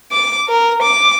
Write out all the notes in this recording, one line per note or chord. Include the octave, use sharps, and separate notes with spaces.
D6
A#4
D6